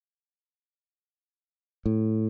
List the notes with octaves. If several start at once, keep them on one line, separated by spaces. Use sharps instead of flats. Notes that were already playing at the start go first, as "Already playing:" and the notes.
A2